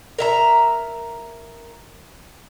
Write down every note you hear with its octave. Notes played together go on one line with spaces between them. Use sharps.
A#4 E5 A#5